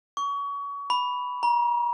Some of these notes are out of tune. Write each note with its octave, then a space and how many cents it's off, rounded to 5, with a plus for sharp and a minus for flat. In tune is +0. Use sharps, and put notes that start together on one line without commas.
C#6 +30
B5 +0
A#5 +40